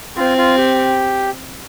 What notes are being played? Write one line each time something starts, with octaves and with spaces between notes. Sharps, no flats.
C4 F4
F4
G4